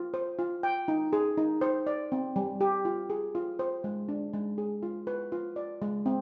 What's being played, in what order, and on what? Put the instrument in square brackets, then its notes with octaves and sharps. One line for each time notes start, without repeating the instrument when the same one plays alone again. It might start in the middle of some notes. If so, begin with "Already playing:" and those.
Already playing: [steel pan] F4
C5
F4
G5
D#4
G#4
D#4
C5
D5
C4
G3
G4
F4
G#4
F4
C5
G#3
D4
G#3
G#4
F4
B4
F4
D5
G#3
C4